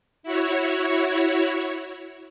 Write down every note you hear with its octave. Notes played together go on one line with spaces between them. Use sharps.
E4 F#4 C#5